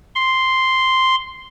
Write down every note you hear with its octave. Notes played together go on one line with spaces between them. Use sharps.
C6